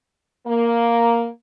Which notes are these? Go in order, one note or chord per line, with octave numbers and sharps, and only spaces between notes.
A#3